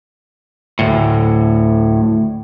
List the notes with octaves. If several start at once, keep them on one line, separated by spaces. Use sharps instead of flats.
D2 A2